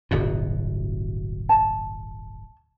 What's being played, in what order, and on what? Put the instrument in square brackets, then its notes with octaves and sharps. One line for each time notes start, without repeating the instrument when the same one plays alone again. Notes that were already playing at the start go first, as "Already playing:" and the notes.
[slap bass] D1 G1 B2 [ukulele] F#4
[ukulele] A5